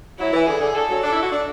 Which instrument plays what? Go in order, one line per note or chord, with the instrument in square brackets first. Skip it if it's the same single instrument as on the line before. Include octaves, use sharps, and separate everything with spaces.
[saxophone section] F#3 [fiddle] E4
[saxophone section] E3
[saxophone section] D3 [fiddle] G#4
[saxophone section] D3
[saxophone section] D3 [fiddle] A4
[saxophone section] F#3
[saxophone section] D4 [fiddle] A4
[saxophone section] E4
F#4
D4